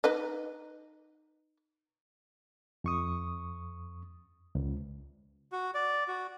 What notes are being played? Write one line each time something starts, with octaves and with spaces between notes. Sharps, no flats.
D#4 B4 D#5
F2 C#6 D#6
C#2
F#4
D5
F#4